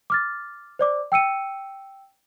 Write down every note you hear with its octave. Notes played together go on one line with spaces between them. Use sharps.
D6 F6 A6
C5 D5 D6
G5 E6 C#7 D#7